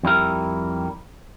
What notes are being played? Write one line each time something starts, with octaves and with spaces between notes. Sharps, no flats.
F2 G3 E4 A#4